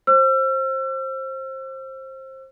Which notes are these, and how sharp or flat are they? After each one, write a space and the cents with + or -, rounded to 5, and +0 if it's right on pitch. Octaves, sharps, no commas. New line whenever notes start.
C5 +20 E6 +40